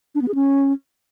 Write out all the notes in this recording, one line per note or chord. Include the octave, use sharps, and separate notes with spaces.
D4
B3
G#4
C#4